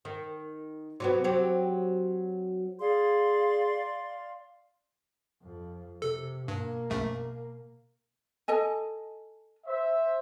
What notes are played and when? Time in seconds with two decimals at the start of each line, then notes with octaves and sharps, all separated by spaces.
0.05 D#3
1.00 C3 F#3 B3
1.24 F#3 C4 G4
2.80 G#4 D5 F5 C6
5.43 F2
6.02 C3 A4
6.48 G2 B2 A#3
6.90 A#1 F#2 A3
8.48 A4 D#5 G#5
9.67 C5 E5